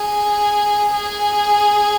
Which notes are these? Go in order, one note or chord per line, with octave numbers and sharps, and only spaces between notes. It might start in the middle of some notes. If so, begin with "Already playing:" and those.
Already playing: G#4
G#4